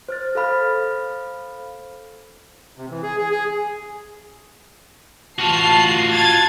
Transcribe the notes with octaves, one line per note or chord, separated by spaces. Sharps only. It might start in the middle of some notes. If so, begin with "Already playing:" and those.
C5 F6 A6
A4 C5 F5 B5 F6
C3
E3
G#4
G#4
G#4
A1 F4 F#4 A5 C7
A5 G#6 A6